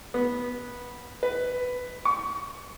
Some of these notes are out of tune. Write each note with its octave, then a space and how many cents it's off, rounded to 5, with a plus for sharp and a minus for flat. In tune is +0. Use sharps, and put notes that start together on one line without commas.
B3 -15
B4 +10
C#6 +15